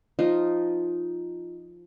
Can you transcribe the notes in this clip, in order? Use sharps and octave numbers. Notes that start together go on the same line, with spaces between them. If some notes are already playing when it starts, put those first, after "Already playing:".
F3 D#4 F4